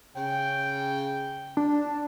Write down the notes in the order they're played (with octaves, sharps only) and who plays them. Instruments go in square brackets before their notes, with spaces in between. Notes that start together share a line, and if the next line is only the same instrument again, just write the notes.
[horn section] C#3 G5
[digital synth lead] D4